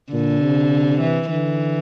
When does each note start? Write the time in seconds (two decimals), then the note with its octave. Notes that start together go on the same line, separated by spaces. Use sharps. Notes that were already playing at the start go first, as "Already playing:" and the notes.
0.12 A#2 D3
0.42 C3
1.01 E3
1.30 D3 E3